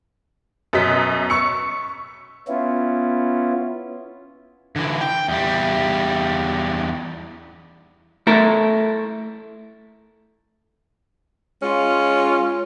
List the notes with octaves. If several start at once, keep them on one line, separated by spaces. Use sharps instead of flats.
F#2 B2 F#3 D#5 B6
C#6 E6 C#7
B3 C#4 E4 F4
D3 E3
G5
E2 G3
A3 E4 A4 A#4
G#3 C#4 F4